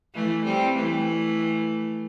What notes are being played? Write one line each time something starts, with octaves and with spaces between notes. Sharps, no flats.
E3 A3
G3 C4
E3 A3